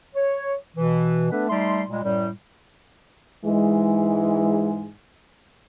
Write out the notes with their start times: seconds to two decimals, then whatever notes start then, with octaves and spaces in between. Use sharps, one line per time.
0.16 C#5
0.76 B2 E3
1.31 A3 B3 D4 A4 B4
1.49 G3 A3 D#4 C6
1.89 A#2 G3 G#3
2.03 F#2 A2 G3
3.45 G#2 E3 G#3